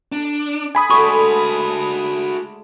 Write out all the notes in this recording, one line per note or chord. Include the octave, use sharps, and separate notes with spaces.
D4 A#5
G#5 B5 C6 D#6
D3 G#3 A3 F#4 A4 C#6